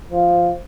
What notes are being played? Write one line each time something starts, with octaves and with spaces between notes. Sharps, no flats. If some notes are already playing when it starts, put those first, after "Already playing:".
F3